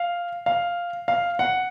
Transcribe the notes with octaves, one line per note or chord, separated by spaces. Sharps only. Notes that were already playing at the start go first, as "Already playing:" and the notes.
Already playing: F5
F5
F5
F#5